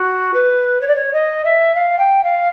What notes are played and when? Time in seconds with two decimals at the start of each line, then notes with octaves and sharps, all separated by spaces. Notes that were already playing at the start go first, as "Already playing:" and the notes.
Already playing: F#4
0.34 B4
0.81 C#5
0.88 D5
0.96 C#5
1.13 D#5
1.45 E5
1.75 F5
1.99 G5
2.24 F5